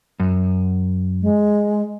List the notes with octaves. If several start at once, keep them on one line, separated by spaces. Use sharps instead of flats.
F#2
G#3